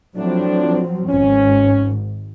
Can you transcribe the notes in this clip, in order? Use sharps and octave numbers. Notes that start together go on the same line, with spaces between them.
A2 F3 F#3 C4 D4
G#1 G#2 C#4